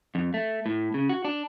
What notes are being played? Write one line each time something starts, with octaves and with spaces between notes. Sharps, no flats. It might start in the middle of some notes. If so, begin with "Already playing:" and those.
F2
A3
A2
C#3
F#4
D4